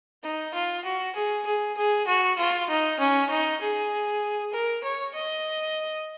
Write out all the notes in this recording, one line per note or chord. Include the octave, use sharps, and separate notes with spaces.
D#4
F4
F#4
G#4
G#4
G#4
F#4
F4
D#4
C#4
D#4
G#4
A#4
C#5
D#5